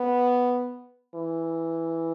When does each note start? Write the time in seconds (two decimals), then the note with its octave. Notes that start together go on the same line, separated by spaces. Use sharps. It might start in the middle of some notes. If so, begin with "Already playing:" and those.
Already playing: B3
1.15 E3